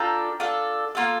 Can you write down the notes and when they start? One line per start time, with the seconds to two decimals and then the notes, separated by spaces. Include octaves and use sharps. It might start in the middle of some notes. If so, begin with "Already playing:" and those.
Already playing: D4 F4 A4 G5 A#5
0.40 D4 F4 A4
0.95 A#3 F4 A4